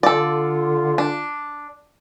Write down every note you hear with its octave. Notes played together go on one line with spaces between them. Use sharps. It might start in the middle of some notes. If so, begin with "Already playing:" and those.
D3 F4 A4 D5
D4